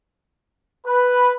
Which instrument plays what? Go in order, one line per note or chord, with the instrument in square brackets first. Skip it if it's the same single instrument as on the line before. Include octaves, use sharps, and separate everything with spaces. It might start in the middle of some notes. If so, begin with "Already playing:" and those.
[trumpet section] B4